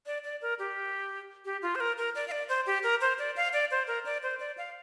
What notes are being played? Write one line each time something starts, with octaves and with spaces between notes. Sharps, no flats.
D5
D5
A#4
G4
G4
F4
C5
A#4
A#4
D5
F5
D5
C5
G4
A#4
C5
D5
F5
D5
C5
A#4
D5
C5
D5
F5